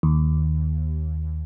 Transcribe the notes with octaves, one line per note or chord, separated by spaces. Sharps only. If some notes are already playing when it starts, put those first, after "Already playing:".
D#2